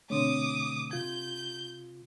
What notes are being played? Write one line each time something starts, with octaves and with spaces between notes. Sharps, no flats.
B2 D3 A3 C4 D4 C#5 D6 D#6
C3 F4 G6 G#6